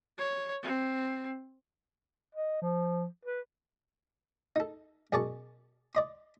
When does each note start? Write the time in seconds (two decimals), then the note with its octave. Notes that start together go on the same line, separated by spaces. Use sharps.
0.18 C#5
0.63 C4
2.35 D#5
2.62 F3
3.25 B4
4.56 D#4 A4
5.12 F#2 B2 G#4 D5 A5 C#6
5.95 D5 D#5 C6